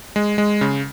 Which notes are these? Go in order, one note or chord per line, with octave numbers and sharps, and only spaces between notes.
G#3
G#3
C#3